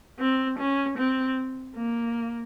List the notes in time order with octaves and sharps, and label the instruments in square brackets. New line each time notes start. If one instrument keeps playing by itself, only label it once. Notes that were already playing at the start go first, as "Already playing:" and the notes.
[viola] C4
C#4
C4
A#3